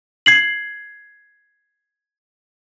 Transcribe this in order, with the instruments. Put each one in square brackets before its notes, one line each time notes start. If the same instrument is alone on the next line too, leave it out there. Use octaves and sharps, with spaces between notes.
[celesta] G#6 C7 F#7